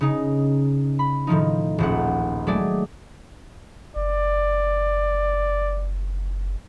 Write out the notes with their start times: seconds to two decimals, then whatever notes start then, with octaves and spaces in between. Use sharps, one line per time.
0.01 C#3 D#4
0.99 B5
1.27 A2 D#3 F3 D#4
1.78 D#1 A#1 F#5
2.47 F#3 G#3 A3 D5
3.96 F#1 D5